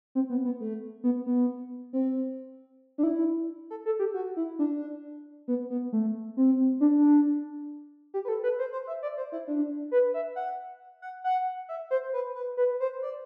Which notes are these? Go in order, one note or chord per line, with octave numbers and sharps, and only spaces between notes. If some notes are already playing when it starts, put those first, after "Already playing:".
C4
B3
B3
A3
B3
B3
C4
D4
E4
A4
A4
G4
F#4
E4
D4
B3
B3
A3
C4
D4
G4
B4
A4
B4
C5
C5
E5
D5
C5
E4
D4
B4
E5
F#5
F#5
F#5
E5
C5
B4
B4
B4
C5
D5